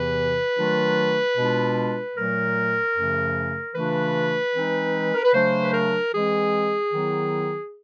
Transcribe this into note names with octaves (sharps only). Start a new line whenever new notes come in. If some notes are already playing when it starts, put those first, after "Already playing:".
Already playing: E2 C3 E3 B4
D#3 F#3 A3 D4 F4
B2 G#3 B3 D4 F4
A#2 F#3 A3 A#4
F#2 C#3 F3 A3
C#3 E3 A3 D4 F4 B4
E3 G#3 C4 D#4
A#4
B4
C#3 F#3 A3 D4 C5
B4
A#4
E3 G#3 C4 G#4
D#3 F#3 B3 E4